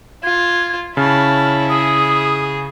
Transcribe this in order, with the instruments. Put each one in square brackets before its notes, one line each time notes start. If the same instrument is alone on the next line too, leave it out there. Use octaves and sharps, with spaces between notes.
[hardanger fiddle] F4 [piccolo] G#6
[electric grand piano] C#3 [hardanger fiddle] E4 [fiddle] C#5 A5 [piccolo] F6
[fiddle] G#4 [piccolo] D#6